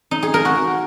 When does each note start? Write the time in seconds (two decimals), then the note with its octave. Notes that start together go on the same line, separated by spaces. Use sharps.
0.11 D#4
0.23 G#4
0.34 A#4
0.45 F#4